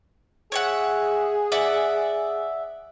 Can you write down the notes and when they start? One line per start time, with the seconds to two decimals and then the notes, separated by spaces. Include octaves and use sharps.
0.52 G#4 C#5 E5 F#5
1.52 D5 E5 F#5